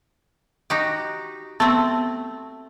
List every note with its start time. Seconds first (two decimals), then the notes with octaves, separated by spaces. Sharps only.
0.70 D#4 F#4 G4
1.60 A3 B3 C4